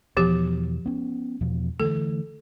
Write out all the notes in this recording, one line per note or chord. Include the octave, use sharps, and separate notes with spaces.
E2 B2 F3 G4
B3 C#4
E2 B2 F3
D3 E3 A3 A4